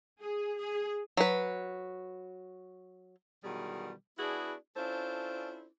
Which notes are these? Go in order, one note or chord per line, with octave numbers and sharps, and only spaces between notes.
G#4
G#4
F#3 B4
B2 D#3 E3 F#3 G3 G#4
B3 D4 E4 F#4 G#4
C#4 D4 E4 F4 A4 C5